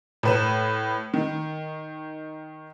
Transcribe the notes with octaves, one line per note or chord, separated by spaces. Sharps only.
A2 B4 E7
D#3